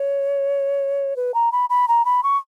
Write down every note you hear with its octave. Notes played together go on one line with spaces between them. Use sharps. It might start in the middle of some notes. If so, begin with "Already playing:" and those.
Already playing: C#5
B4
A#5
B5
B5
A#5
B5
C#6